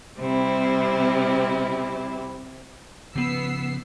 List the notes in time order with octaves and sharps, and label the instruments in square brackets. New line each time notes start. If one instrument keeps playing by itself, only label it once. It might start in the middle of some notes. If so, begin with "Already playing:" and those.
[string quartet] C3 G3 C4 E4
[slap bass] C#3 F3 [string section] B3 E6 C7